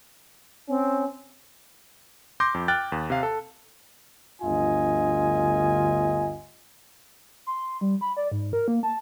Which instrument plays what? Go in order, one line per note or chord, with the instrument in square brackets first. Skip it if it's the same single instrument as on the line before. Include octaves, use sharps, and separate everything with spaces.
[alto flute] C4 [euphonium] C#4
[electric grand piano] C6 D6 G6 A#6
F2
G5 F6 F#6 A6
D#2
C3 F5
A4
[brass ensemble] G1 D2 F4 D#5 G#5
[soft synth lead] C6
G3
B5
D5
G#2
A#4
A#3
A5